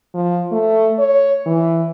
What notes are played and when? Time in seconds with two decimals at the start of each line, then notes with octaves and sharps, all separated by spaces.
0.14 F3
0.52 A3
0.99 C#5
1.46 E3